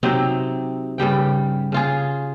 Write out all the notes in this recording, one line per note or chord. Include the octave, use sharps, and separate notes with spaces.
C3 F#3 C4 D#4
G2 C#3 G3 G5
C#3 F4 G#4